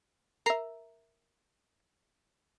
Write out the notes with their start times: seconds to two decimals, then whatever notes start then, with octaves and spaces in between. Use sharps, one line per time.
0.46 A#4 E5 A#5 C7